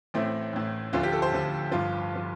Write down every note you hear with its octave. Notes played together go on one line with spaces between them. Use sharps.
A1 A2 A3 C4
A1 A2 A3
D2 D3 F3 F4
G4
A4
C5
D2 D3 F3
G1 G2 F3 F4
F3